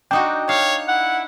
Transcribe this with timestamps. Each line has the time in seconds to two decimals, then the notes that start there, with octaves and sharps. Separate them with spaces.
0.11 D4 D#4 F#4 G5
0.49 C#5 F5
0.88 E4 F#5